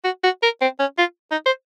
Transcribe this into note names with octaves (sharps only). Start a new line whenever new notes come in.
F#4
F#4
A#4
C4
C#4
F4
D#4
C5